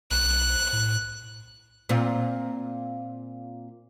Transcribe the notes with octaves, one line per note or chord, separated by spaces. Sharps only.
B1 F#6
A2
A#2 C4 F4